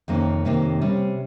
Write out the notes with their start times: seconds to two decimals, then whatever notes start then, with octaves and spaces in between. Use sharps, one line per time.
0.08 F2 C3 D#3 A#3 C#4
0.45 F2 C3 D#3 A#3 C#4
0.81 C3 G3 C#4